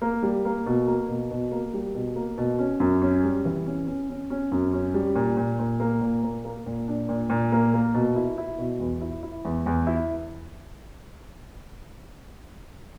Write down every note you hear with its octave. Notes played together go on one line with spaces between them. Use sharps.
A#3
G3
A#3
B2
A#3
B2
B2
A#3
G3
B2
A#3
B2
C#4
F#2
C#4
G3
E3
C#4
C#4
C#4
C#4
F#2
C#4
G3
A#2
A#2
A#2
A#3
A#2
A#3
A#3
A#2
D4
A#2
A#2
A#3
A#3
B2
E4
E4
B2
E2
E4
E4
E2
E2
E4